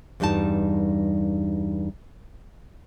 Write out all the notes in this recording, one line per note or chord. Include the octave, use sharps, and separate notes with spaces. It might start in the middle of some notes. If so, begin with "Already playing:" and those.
E2 G2 G3 D#4 A5